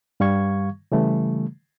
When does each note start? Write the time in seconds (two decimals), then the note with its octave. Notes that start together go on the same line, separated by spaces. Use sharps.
0.20 G2 G3 F5 C#6 G#6
0.92 C#3 E3 G3 A3